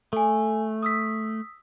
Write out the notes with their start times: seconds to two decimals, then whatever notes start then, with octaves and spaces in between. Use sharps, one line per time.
0.13 A3 A4 G#5
0.83 D#6 E6 B6